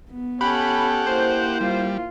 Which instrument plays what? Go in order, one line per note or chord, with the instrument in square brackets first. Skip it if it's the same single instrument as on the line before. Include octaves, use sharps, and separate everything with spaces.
[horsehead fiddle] B3
[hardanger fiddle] C#4 A4 [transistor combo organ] G4 F#5 [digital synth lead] B5
[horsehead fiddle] A#3 E4 [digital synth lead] C5
[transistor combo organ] G3 [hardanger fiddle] F4